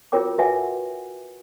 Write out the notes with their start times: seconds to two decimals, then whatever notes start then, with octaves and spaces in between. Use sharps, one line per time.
0.12 F4 F#4 A#4 C#5 G5 D6
0.38 F#4 B4 C#5 E5 F#5 G#5